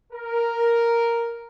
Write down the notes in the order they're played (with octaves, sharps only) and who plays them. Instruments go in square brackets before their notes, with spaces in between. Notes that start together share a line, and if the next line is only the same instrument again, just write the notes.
[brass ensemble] A#4